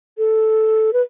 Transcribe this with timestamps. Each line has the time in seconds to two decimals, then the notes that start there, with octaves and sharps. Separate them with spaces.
0.18 A4
0.93 B4